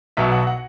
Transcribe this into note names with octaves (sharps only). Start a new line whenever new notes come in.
B1 B2 F#3 E5
F#5
F#5